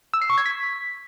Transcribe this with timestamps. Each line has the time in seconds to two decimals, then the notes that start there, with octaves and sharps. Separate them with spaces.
0.14 E6
0.22 C7
0.30 C#6
0.38 G#6
0.46 B6